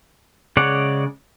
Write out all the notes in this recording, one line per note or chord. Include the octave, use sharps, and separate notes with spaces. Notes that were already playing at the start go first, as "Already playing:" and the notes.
C#3 G#3 C#5 D5 F#5